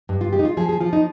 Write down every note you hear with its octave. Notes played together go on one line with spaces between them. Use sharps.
G2
F4
G#3 G4
D#4
F4
F3 G#4
G#4
F3 F4
D#4